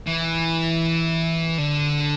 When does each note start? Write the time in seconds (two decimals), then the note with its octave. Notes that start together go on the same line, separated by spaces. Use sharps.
0.07 E3
1.58 D3